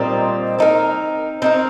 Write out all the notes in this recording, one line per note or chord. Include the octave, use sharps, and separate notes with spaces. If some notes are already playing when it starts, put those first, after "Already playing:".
Already playing: A#2 G3 C4 D#4
C4 D#4 A#4
C4 D#4 A#4